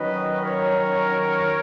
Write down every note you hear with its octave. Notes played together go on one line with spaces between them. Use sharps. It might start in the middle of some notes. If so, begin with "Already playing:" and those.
Already playing: D#3 F#3 C#4 B4 D#5
A#4 C#5